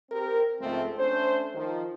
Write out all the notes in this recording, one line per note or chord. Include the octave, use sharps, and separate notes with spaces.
C4 G4 A#4
C#2 G#2 F3 G#3 A3 C4
A3 C#4 D4 C5
D#3 F3